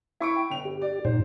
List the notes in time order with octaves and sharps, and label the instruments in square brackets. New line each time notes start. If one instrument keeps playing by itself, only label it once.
[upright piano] E4 C#6 D7
[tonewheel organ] G5
[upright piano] G1 F7
[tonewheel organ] G4
[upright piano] D5
[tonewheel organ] G2 A#2 D#4 [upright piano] C5